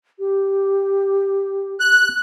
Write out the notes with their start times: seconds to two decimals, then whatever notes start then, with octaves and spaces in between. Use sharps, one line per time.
0.19 G4
1.80 F#6